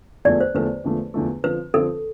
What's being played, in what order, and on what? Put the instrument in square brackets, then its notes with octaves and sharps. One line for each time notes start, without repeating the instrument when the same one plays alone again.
[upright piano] E2 D3 F3 A3 [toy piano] D5
[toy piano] C5
[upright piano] E2 D3 F3 A3 [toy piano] B4
[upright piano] E2 D3 F3 A3
E2 D3 F3 A3
[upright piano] D3 F3 C4 [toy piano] B4
[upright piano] D3 F3 C4 [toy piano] A4